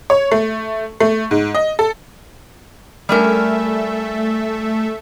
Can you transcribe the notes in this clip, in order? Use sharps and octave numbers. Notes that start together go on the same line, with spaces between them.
C#5
A3
A3
G#2
D#5
A4
G3 A3 C#4 A4 A#4 E5